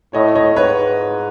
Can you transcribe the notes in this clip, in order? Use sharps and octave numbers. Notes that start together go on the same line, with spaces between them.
A2 C#5 D#5
C#5 D#5
G#2 B4 C#5